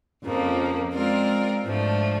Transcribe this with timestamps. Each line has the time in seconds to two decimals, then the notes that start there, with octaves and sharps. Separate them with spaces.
0.23 F2 C#3 F3 A#3
0.93 G#3 C4 F4 A#4 D5
1.63 G#2 F3 A3 D4